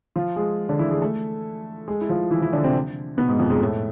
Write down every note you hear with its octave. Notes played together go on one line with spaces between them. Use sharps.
F3 F4
G#3 G#4
D3 D4
E3 E4
G#3 G#4
A3 A4
G#3 G#4
E4
F3 F4
E3 E4
E3 E4
D3 D4
C3 C4
B2 B3
G#2 G#3
F2 F3
G#2 G#3
A2 A3